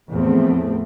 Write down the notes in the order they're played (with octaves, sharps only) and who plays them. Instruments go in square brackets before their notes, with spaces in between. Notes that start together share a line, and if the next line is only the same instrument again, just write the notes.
[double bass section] E2 A2 F3 A3 C4